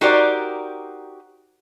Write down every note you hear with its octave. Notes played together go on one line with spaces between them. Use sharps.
D#4 F#4 G4 A#4 C5 D5